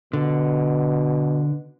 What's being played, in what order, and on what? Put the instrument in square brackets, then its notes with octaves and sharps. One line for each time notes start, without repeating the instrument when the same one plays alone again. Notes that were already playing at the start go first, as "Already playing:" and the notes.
[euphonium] B2 [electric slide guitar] D3